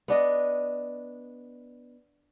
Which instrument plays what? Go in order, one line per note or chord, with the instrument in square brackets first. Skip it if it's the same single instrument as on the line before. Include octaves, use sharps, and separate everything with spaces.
[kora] B3 D4 D#5